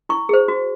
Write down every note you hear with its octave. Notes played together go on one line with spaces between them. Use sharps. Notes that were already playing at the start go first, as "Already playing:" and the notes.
E4 C#6
G#4 C5
F#4